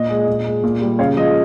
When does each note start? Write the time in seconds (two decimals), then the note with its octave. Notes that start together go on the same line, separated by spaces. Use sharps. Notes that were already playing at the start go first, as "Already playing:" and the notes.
Already playing: A#2 D#5
0.10 G#3
0.28 A#2
0.45 G#3
0.63 A#2
0.82 G3
0.99 C#3 C#5 F5
1.16 F3 G#3 D#5